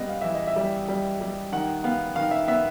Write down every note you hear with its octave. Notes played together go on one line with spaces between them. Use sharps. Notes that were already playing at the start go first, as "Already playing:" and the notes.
Already playing: C#3 G3 B3 D#5
F5
E3 E5
D#5
E5
G3
G3
G3
D#3 F#5
B3 F5
D#3 F5
E5
B3 E5